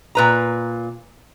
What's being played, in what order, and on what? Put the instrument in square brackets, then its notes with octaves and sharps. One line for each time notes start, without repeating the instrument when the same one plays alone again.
[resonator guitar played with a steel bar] A#2 B4 A#5